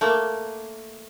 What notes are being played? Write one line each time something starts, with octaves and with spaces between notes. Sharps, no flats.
A3 A#3 D5